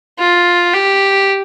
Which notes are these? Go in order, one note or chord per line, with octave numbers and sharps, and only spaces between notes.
F4
G4